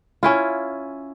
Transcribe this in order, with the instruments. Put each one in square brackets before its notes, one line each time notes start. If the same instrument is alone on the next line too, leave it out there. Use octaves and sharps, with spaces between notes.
[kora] C#4 E4 F4